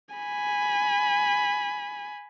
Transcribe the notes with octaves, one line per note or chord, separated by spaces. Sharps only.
G#5 B5